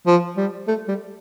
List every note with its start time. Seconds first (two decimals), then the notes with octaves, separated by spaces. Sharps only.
0.06 F3
0.37 G3
0.68 A3
0.88 G3